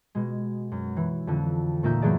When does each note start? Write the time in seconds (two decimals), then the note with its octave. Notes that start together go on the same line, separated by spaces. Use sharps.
0.15 B2 G#3
0.72 F#2
0.97 E3
1.27 F2 D3
1.83 D2 A#2 A#3 D#4 E5 G6
2.02 F#2 E3 F#3 A3 G#4 D5